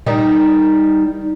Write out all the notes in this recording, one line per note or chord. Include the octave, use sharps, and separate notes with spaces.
D#3 G3 D#4